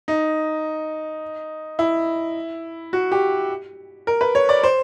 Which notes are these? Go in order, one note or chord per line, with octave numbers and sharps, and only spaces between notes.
D#4
E4
F#4
G4
A#4
B4
C#5
D5
C5